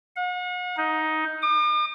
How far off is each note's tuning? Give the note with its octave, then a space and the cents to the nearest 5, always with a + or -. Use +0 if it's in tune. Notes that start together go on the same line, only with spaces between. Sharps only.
F#5 -40
D#4 +10
D6 +45